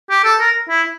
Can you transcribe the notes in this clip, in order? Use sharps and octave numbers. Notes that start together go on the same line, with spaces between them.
G4
A4
A#4
E4